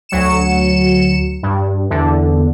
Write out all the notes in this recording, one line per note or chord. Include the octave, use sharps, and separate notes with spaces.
D2 F#3 C#7 E7
G2
E2 D3